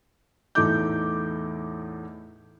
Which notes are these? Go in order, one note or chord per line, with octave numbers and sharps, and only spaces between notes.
E2 A2 A3 D#4 D6 G6